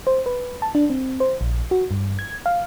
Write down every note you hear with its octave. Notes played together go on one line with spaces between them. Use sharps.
C5
B4
A5
D4
C4
C5
A#1
F#4
G2
G#6
F5